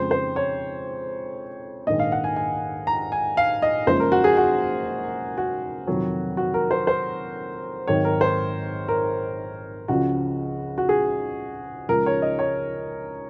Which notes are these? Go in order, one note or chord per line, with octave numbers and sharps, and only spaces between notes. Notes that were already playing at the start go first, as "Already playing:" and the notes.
Already playing: F2 C#3 G#3 C5
C5
C#5
A#1 G#2 D#3 G#3 D#5
F5
F#5
G#5
G#5
A#5
G#5
F5
D#5
F#1 F#2 F3 G#3 C5
A#4
F#4
G#4
F#4
F#4
F2 C3 D#3 F#3
F#4
A#4
C5
C5
G#1 G#2 D#3 F#3 C#5
A#4
C5
A#4
C#2 C#3 F3 F#4
F#4
G#4
C#2 C#3 F3 G#3 A#4
C#5
D#5
C#5